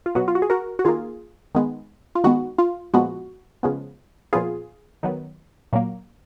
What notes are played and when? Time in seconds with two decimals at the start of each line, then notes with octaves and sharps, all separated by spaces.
0.06 F4
0.15 B2 F#3 B3 F#4
0.28 F4
0.35 F#4
0.42 G#4
0.50 F#4 A#4
0.79 F#4
0.85 D#3 A#3 F4 G#4
1.55 D#3 G#3 B3
2.15 F4
2.24 D#3 G#3 B3 F#4
2.58 F4
2.94 A#2 F3 G#3 B3 F#4
3.63 C#3 F3 G#3 B3
4.33 A#2 F3 B3 F4 G#4
5.03 D#3 F#3 B3
5.73 A#2 F#3 A#3